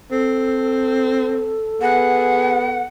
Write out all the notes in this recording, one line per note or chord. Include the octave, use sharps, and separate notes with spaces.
C4 A4
B3 G#4 F#5